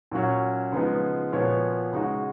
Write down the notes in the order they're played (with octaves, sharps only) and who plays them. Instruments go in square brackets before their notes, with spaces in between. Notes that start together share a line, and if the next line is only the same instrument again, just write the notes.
[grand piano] A#2 F#3 C#4 F#4 C#5
C#3 F3 G#3 B3 D#4
A#2 F3 B3 F#4 C#5
C#3 G#3 D#4 F#4